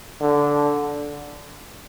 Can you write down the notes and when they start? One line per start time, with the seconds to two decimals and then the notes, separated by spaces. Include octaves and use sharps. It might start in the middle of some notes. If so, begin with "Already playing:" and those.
0.21 D3